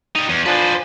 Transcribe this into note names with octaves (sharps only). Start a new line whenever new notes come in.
G3 D#4
E2
E3 F3 D4 B4 C5